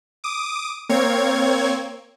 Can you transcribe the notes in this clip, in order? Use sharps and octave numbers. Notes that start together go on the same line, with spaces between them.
D6 D#6
A#3 C4 C#5 G#6